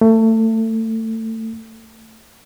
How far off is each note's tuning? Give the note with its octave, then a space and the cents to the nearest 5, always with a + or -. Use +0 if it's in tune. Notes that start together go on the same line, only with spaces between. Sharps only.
A3 +25